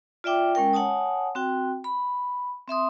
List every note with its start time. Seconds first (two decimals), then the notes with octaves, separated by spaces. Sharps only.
0.24 F4 D5 E5 G5 D6
0.55 G#3 C#4 A#4 G5
0.73 C#5 F#5 G#5 A5 D#6
1.35 C4 F#4 G5
1.84 B5
2.68 C4 E5 C6 D#6